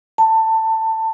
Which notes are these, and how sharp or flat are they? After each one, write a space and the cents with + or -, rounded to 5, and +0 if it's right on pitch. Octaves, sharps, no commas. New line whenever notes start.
A5 +20